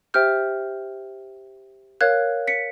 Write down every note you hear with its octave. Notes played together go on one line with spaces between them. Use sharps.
G4 C5 E5 G5 F6 G6
A#4 C#5 F5 F#6 G#6
B6 C#7